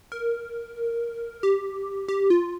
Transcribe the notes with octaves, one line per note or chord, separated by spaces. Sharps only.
A#4
G4
G4
F4